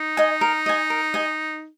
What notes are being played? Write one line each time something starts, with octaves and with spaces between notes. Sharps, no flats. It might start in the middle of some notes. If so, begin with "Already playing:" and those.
Already playing: D#4
D#5 G#5
A#4
D#5 G#5
A#4
D#5 G#5